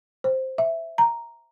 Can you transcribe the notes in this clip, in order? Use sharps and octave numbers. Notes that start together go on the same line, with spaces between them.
C5
E5
A#5